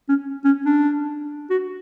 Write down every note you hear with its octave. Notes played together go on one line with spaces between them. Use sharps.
C#4
C#4
D4
F#4